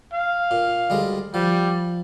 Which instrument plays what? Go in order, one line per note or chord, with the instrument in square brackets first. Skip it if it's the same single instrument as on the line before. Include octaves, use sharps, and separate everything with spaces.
[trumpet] F5
[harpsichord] A#2
D2 G3 G#3
[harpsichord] F3 [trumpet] G3